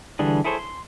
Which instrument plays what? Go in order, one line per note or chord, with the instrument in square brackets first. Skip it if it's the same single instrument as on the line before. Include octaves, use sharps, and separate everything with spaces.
[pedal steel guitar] D3 E3 G3 D4 G#4
E4 G#4 A4 C5 C#5
C6